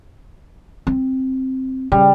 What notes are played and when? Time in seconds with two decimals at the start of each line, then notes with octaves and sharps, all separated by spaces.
0.87 C4
1.92 C#3 G3